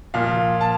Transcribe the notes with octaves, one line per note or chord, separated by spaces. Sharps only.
A#2 F3 F5
A5